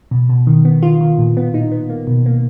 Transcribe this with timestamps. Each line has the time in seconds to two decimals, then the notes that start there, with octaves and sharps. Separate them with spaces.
0.11 B2
0.29 B2
0.47 D#3
0.65 B3
0.82 D#3 F4
1.01 D#3
1.18 A#2
1.37 B3
1.54 A#2 D#4
1.72 B3
1.89 A#3
2.07 B2
2.26 A#3